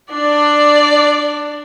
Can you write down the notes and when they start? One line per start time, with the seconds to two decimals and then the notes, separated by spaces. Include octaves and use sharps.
0.11 D4 D5